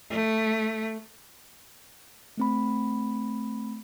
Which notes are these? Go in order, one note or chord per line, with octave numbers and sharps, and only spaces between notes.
A3
A3 C4 B5